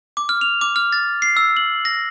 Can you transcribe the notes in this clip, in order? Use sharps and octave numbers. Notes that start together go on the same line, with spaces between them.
D6
F6
F7
D6
F6
A6
C7
E6
F#7
A#6